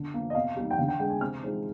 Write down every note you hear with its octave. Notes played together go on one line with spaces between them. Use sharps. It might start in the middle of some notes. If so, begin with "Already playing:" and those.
Already playing: D3
F3 A#3
D#5
C3 F5
G3 A#3 D#4
G5
D3 F5
G5
G#3 D4 G5
G#5
C3 F6
F3 G#3 C4 D#4